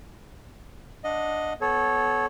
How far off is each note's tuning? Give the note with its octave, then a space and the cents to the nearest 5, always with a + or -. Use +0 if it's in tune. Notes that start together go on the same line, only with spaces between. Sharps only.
D4 +0 D#5 +0 F#5 -35
B3 +10 A4 -30 C#5 -10